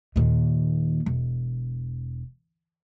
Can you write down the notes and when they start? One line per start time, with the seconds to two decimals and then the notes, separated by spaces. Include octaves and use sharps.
0.16 D#2 A#2
1.06 E1